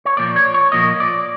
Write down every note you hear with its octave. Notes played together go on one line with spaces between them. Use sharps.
C#5
A#2 F3 A#3 D5
C#5
C#5
A#2 F3 A#3 D#5
D5